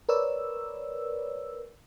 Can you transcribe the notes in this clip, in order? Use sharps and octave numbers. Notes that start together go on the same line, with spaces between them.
A#4 B4 C#5 D5 E6